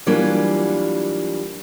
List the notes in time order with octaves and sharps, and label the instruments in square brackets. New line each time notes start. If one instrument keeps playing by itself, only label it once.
[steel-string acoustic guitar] E3 F#3 G3 A#3 D4 F4